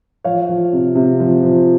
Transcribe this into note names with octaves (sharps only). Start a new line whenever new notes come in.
F3 C#5 F5
F3
C3
C3
F3
F3